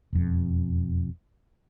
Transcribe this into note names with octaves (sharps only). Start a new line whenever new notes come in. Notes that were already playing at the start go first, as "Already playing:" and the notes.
E1 F2